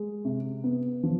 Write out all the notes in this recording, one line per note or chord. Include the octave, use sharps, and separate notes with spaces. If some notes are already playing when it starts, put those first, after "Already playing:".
Already playing: G#3
C3
B3
F3